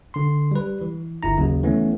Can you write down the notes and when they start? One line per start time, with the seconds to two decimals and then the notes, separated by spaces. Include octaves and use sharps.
0.14 D3 C6
0.51 G3 B4
0.81 E3
1.23 G1 E4 A#5
1.37 D#2 C#3 F#3
1.63 E3 A3 B3 C#4